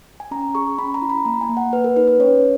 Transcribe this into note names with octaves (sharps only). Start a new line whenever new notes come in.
G#5
C#4 A#5
G#4 C#6
C#4 B5
A#5
E4
B5
A#3 A#5
G#5
A#3
F#5
A#3 B4
A#4
D#4 B4
B4
C#4 C#5